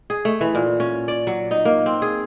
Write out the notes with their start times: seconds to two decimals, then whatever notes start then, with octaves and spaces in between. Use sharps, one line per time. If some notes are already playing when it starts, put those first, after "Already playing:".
0.10 G#4
0.25 A3
0.41 E3
0.55 A#2
0.80 C#4
1.08 D5
1.27 F#3
1.51 D#4
1.65 A#3
1.86 C4
2.02 G#4